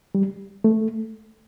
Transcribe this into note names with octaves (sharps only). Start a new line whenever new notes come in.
G3
A3